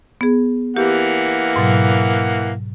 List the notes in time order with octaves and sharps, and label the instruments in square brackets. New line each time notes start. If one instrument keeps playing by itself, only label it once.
[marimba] B3 G#4
[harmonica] E3 A#3 F#5 [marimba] G4
[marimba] G#2 B2 F#3